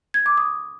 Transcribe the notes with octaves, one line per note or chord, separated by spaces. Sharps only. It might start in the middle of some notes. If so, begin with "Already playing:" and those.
G#6
D6
D#6